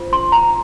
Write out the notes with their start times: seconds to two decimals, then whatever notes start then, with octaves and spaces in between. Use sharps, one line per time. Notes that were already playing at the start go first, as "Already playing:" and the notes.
Already playing: F4 C5
0.13 C6
0.32 A#5